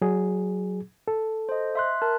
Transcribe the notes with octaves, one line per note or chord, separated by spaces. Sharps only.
F#3 G#4
A4
C5 D#5
E5 C6 F#6
A#4 A5 F#6